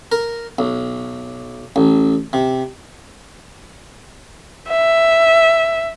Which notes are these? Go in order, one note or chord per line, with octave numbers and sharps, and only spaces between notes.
A#4
B1
A1
C3
E5